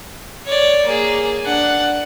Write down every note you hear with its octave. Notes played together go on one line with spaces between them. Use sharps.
C#5 D5
A#3 G#4
D4 F#5